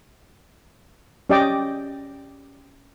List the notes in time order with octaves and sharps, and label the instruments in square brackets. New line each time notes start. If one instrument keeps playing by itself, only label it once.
[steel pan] C#4 G4 D5 D#5 G5 D6